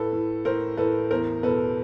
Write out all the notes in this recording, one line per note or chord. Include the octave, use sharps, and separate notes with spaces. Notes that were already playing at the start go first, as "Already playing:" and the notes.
Already playing: A2 A4 B4
A2
A2 A#4 C5
A2 A4 B4
E2 A#4 C5
B2 A4 B4